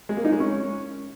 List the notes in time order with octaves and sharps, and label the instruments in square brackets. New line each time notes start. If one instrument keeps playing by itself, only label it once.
[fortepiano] G#3
A#3
D#4
G#3
C#4